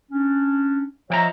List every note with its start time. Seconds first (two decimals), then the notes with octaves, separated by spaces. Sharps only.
0.12 C#4 D4
1.10 F3 C#5 D#5 E5 G5 A#5